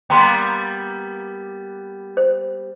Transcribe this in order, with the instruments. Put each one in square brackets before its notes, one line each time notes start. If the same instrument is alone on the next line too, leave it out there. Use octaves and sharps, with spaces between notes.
[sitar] G3 A#3 B3 [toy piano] G5 A#5 C6
[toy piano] C5